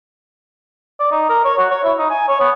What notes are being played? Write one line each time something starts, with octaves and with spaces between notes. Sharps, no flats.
D5
D#4
A#4
C#5
F#4
C#5
E4
D#4
G#5
C#5
B3